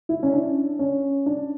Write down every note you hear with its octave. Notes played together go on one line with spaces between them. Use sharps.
E4
C#4
D4
C#4
D4